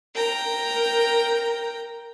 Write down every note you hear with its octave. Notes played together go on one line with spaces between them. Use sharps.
A#4 G5 A#5